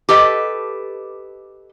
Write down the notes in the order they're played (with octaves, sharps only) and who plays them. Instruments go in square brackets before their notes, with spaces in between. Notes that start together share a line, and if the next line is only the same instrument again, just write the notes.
[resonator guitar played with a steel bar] G4 A4 B4 D#5